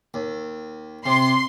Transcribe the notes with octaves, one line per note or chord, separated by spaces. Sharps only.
D#2
C3 C6